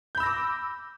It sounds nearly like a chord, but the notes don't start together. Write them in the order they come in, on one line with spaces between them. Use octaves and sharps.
G6 B5 E6 A#6 D6